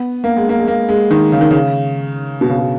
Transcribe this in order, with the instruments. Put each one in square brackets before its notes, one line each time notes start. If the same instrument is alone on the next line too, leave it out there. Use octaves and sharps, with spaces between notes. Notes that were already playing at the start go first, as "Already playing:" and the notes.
Already playing: [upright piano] B3
A#3
G#3
A#3
G#3
A#3
G#3
D#3
C#3
D#3
C#3
B2
C#3
B2